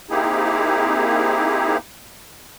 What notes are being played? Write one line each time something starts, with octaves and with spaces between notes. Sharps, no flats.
A#3 C4 D#4 E4 G4 G#4